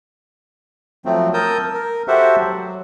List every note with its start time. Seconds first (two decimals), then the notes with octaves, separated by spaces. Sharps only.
1.05 F3 F#3 A3 C4
1.34 A#4 A5 D#6 E6 G6
1.74 A#4
2.08 F#4 G4 A4 C5 E5 F#5
2.39 F#3